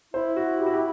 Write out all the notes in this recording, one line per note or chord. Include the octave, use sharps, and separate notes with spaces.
E4 C5
F#4
G4
F#4
G4